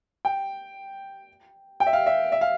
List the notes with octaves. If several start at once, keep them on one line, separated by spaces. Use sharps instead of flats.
G5
G5
E5
F5
E5
E5
F5